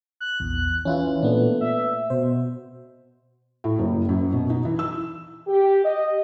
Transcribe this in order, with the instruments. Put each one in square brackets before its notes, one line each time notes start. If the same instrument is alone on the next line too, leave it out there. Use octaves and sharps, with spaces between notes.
[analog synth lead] F#6
[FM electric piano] A#1 E2
[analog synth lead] E3 [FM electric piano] C#4 E4 F4
[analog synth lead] A#2 [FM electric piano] A3 B3 D4
[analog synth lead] E5
[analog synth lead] B2 [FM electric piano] C5
[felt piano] A2
F#1
F#2
B2
D#4
E3
E6
[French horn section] G4
D#5